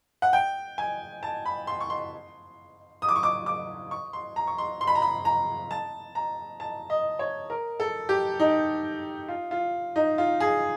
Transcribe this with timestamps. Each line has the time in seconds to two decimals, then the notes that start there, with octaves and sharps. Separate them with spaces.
0.22 F#5
0.33 G5
0.78 G#5
1.23 A5
1.46 B5
1.67 C6
1.80 C#6
1.90 C6
3.02 D#6
3.09 D6
3.16 C#6
3.23 D6
3.46 D6
3.91 C#6
4.13 C6
4.36 A#5
4.47 C#6
4.58 C6
4.81 C6
4.87 B5
4.95 A#5
5.02 B5
5.25 A#5
5.71 A5
6.15 A#5
6.60 A5
6.90 D#5
7.19 C#5
7.50 A#4
7.80 A4
8.09 G4
8.40 D#4
9.28 F4
9.51 F4
9.96 D#4
10.18 F4
10.40 G#4